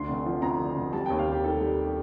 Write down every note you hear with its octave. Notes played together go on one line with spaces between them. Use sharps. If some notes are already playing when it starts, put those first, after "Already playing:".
Already playing: D2 D3 C6
F1
F3
F2 A#5
D3
F1
G3 A5
D#2 G5
F5
D#2 G4
D#3 A4
G3